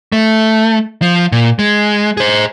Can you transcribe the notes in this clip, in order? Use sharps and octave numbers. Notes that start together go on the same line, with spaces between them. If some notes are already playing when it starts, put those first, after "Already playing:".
A3
F3
A#2
G#3
G#4 C5